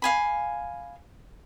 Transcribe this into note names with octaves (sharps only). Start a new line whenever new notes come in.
F5 G#5 B5